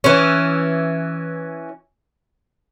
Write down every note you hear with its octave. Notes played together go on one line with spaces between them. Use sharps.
E3 C#4